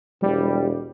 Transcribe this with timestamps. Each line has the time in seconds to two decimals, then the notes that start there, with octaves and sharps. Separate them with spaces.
0.22 E1 G3